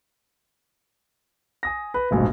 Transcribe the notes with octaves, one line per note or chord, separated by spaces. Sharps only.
G#5 D#6 A#6
B4
F1 A#1 G#2 B2